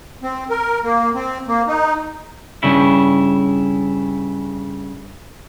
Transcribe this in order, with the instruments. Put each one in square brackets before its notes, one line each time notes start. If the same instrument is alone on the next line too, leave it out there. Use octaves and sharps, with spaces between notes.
[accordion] C4
A#4
A#3
C4
A#3
D#4
[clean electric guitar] G2 C#3 E4